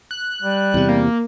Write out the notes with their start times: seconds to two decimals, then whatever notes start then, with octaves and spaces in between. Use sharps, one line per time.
0.11 F#6
0.43 G3
0.74 E2 C3
0.89 A#3